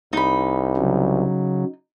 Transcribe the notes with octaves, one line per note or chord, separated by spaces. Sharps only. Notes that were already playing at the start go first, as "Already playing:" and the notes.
C2 D#4 B5
C#3 F#3